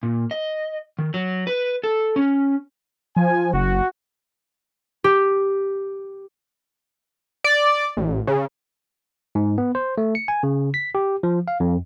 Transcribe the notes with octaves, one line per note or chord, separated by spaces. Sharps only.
A#2
D#5
D#3
F#3
B4
A4
C#4
F3 G#5
F#1 F#4
G4
D5
A1
C#3
G#2
B3
C5
A3
C#7
G#5
C#3
B6
G4
F3
F5
F2